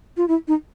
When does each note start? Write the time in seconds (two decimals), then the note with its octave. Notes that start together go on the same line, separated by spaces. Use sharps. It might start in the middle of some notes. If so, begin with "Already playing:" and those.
0.17 F4
0.28 E4
0.48 D#4